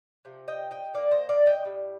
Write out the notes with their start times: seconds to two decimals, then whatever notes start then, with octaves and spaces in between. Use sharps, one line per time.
0.25 C3 F3
0.48 D#5 G5
0.71 D#5 G5
0.94 D#3 A#3 D5 F5
1.11 C5 D#5
1.29 D5 F5
1.46 D#5 G5
1.64 A2 G3